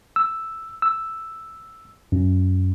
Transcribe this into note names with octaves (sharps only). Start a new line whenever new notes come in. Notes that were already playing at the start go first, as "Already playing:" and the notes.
E6
E6
F#2